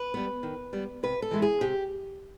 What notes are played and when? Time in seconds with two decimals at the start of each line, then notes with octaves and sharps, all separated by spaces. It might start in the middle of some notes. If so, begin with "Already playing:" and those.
Already playing: B4
0.14 G3 B3
0.43 D#3
0.73 G3 B3
1.03 C3 B4
1.22 A4
1.31 E3 G#3 B3 E4
1.42 G#4
1.61 C3 G4